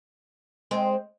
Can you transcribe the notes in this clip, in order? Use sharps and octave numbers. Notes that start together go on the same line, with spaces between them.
G#3 C4